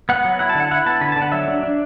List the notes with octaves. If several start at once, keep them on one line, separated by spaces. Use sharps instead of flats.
B3 F#5
F#3
E4 F#5
A5
D3 F#5
E4 F#5
B3 A5
D3 B5
A5
D3
F#5
F#3 E5
D4
D4